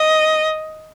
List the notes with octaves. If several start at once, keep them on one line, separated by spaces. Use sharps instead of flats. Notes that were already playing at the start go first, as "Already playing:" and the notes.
Already playing: D#5